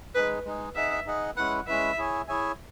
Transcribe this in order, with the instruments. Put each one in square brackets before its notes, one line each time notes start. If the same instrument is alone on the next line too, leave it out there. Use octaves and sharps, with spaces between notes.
[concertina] G#3 D#4 G#4 [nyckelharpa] B4
[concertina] G#3 D#4 G#4
[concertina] D#4 G#4 D#5 F#5 [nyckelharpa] E5
[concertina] D#4 G#4 D#5 F#5
[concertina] G#3 C#4 E4 B4 [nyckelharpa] F#5
[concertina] G#3 C#4 E4 B4 [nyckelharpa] E5
[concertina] E4 G#4 C#5 E5 G#5
E4 G#4 C#5 E5 G#5